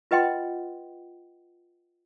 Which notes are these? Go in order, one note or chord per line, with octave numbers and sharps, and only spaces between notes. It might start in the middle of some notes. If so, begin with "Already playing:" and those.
F4 B4 D#5 F#5 G5 C6